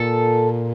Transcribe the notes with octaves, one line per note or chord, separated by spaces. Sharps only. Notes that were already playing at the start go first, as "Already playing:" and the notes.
Already playing: A#2 A4